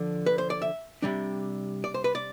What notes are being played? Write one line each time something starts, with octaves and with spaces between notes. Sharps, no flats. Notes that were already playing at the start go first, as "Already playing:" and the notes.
Already playing: D3 F3
B4
C5
D5
E5
C3 G3 D4
D5
C5
B4
D5